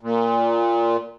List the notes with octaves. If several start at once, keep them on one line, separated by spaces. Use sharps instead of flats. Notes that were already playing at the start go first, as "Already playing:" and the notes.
A#2